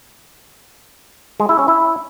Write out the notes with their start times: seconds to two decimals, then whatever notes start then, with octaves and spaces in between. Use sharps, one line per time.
1.40 G#3
1.49 E4
1.59 C#4
1.68 E4